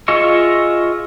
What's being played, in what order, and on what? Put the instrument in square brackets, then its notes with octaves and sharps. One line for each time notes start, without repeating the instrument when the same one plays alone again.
[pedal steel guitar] F4 G#4 D#5 E5 C#6